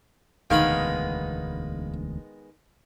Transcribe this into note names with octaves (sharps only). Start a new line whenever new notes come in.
E1 D2 D#3 G#3 B3 F5 B5